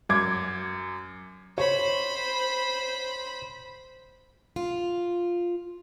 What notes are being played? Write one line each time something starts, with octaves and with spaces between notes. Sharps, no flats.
F#2 D6 G#6
C5 C#5 B5
F4